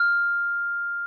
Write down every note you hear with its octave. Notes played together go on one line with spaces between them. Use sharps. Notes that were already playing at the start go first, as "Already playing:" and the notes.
Already playing: F6